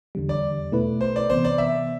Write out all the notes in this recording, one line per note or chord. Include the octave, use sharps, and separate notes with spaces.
E2 D3 G3
D5
B2 A3 E4 B4
C5
D5
C3 E3 B3 C5
D5
E5